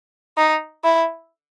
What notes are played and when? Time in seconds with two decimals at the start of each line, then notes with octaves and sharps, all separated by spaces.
0.37 D#4
0.84 E4